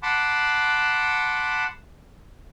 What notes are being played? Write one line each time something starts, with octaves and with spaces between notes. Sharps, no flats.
F#5 A5 B5 C6 D6